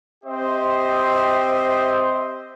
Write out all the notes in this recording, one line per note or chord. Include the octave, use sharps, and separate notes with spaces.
C4 G4 C5 D#5 E5